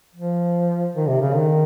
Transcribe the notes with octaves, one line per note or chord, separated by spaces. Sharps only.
F3
D#3
C3
C#3
D#3